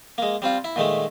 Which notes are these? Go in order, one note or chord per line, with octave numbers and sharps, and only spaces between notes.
G#3 A#3
G3 C4 F4
E4
A#2 D#3 G#3 A3